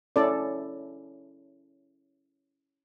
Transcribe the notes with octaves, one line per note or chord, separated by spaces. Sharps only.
C#4 E4 A4 D5